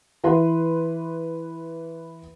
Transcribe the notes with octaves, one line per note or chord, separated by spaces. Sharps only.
E3 B4 C6